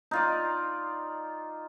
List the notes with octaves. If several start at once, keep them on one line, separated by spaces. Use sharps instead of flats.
D#4 F4 D5